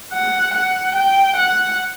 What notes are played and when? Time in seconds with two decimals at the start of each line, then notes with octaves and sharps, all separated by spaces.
0.14 F#5
0.54 F#5
0.96 G5
1.37 F#5